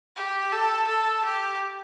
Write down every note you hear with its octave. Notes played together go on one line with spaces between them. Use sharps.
G4
A4
A4
G4